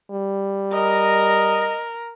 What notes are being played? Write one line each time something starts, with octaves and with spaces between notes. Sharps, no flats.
G3
A#4 D#5